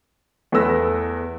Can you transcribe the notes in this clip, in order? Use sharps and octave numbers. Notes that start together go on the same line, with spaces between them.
E2 A3 B4 E6 A#6